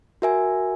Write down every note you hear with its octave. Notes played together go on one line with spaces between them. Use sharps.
F#4 A#4 E5 G#5